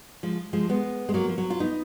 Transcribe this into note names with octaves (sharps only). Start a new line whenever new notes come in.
F3 G#3
F3 G#3
G#3 B3
G#3
F#3 A#3
F3
F#3
F4
B3 D#4